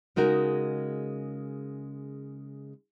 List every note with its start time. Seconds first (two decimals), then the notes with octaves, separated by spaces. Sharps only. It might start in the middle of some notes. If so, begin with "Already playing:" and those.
0.16 C#3 G#3 D#4 F#4 A#4